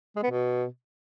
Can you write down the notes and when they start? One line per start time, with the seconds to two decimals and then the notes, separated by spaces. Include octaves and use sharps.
0.16 G#3
0.23 B3
0.30 B2